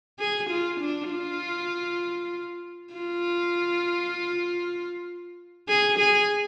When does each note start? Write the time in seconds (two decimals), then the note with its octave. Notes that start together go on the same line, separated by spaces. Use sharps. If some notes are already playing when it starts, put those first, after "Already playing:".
0.19 G#4
0.50 F4
0.80 D4
1.10 F4
2.93 F4
5.68 G#4
5.99 G#4